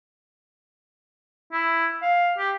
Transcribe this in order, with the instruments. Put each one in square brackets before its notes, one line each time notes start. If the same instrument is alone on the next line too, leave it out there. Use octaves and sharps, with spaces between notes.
[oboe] E4
F5
G4